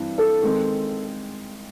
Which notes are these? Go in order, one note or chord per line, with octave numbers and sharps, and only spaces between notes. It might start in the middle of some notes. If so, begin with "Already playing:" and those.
Already playing: G2 E3 C4
A4
D#3 G#3 C4